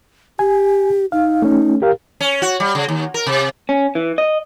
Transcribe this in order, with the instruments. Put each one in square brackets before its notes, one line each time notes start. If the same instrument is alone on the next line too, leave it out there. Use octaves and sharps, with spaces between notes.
[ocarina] G4 [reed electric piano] G#5
[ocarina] D#4 [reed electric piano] F5
[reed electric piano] A3 C#4
G4 A#4 F5
[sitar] C#4
F#4
G3
C#3
D#2
A#4
C3
[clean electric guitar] C#4
E3
D#5